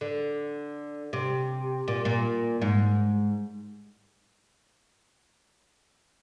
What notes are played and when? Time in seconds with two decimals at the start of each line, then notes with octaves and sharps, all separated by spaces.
0.01 D3
1.13 C3
1.88 A#2
2.05 A#2
2.62 G#2